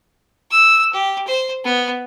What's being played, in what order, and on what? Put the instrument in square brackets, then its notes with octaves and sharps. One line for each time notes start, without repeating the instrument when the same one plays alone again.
[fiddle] E6
G4
C5
B3